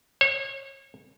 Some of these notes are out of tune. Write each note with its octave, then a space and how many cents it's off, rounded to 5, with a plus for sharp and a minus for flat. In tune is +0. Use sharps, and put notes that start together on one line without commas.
C#5 -30